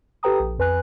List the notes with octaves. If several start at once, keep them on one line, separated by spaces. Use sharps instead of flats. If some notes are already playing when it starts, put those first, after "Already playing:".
G4 A4 B4 G5 A#5 D#6
A#1
F2 B4 G#5 F#6